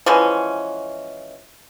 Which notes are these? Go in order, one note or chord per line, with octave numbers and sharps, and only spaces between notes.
E3 F3 G#3 C#4